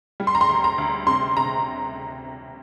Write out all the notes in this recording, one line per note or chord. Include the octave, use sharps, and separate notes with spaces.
G3
C6
A#5
C6
D2
A#5
D2
C3 C6
C3 A#5